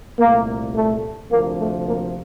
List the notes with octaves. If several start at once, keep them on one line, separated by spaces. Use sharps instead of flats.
C2 A#2 A3 A#3
A3
D2 C3 F3 A#3
A3
A#3